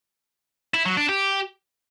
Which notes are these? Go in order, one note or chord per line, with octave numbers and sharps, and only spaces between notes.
E4
F#3
D4
G4